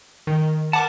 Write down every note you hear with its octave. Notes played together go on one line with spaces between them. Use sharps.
D#3
A#4 B4 F#5 A5 D6